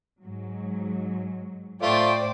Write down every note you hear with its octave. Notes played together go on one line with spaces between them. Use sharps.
G#2 F#3
A2 A3 F4 C5 D5 G5